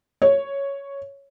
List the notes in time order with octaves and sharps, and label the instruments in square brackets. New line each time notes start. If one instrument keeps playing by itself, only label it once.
[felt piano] C#5